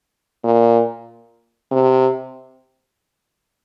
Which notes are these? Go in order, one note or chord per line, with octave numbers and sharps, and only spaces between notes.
A#2
C3